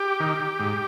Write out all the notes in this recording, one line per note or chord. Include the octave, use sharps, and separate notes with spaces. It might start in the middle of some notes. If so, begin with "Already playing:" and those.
Already playing: G4
D#3
G#2